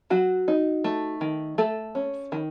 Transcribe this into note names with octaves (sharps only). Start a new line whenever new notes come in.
F#3 F#4
D#4
A3
D#3
A3 A4
C#4
D#3